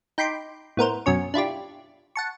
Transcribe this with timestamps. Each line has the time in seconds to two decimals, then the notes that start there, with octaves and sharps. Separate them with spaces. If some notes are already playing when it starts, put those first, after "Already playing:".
0.18 D#4 G5 B5 C6 D6
0.77 A2 B3 A#4 C5
1.06 F#2 B2 C#4 C#6
1.34 D4 E4 F4 G4
2.16 F#5 A5 C#6